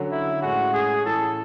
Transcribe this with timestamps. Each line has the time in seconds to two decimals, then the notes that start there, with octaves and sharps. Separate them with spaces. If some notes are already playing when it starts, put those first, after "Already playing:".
Already playing: D3 F#3 C#4
0.11 E4
0.42 A2 G#3 C#4 F#4
0.73 G#4
1.05 A2 E3 A3 C#4 A4